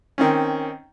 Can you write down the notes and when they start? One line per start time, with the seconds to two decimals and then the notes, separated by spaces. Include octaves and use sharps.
0.18 D#3 C4 C#4